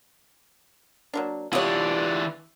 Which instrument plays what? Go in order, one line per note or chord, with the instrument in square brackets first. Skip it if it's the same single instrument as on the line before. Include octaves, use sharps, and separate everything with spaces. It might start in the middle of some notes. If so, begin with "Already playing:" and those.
[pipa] F#3 A#3 D4
[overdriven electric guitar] E3 D4 [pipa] B3 C#5 [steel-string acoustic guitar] F4 G4